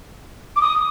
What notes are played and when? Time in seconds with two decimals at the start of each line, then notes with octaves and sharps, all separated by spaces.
0.56 D6
0.61 D#6